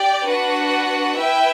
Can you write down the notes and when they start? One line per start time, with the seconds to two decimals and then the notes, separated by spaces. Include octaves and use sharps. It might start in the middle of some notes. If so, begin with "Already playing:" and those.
Already playing: G4 D5 G5
0.25 D4 F#4 B4 F#5
1.17 E4 B4 E5 G5